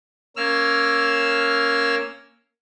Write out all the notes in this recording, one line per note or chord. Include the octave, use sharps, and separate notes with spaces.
A#3 C#4 E6 F6